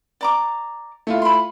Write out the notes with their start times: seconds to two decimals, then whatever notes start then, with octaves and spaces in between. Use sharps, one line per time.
0.21 D5 A#5 D6
1.07 A3 E4 F4
1.22 B5 C6